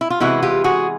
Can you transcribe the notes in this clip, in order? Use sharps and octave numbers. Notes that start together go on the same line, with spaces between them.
E4
F4
C3 E3 G#3 B3 E4 F#4
F4 G4
F#4 G#4